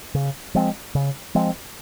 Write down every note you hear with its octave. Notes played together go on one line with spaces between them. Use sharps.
C#3
F3 G#3 C4
C#3
F3 G#3 C4